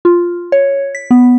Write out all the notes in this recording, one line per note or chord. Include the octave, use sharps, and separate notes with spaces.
F4
C#5
B6
B3